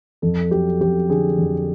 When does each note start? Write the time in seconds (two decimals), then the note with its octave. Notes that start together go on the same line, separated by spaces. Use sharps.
0.22 F2 A4
0.51 F#3 G4
0.81 F2 G4
1.10 D3 G#4
1.39 F2